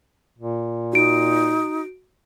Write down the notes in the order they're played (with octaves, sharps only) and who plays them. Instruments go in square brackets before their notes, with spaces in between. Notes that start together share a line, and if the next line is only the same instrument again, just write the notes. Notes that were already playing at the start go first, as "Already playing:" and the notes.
[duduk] A#2
[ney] D#4 [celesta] F#4 D7